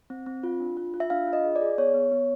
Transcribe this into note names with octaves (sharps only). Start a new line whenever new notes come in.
C4
C4
F4
D4
F4
F4
E5
D4 F5
F4
D#5
G#4
D5
G#4
B3 C#5
B3
B3